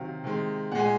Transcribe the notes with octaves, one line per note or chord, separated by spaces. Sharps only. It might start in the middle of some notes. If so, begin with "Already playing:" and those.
Already playing: C3 D#3 F#3 F5
C3 D#3 G#3
A#2 G#3 F#5 G#5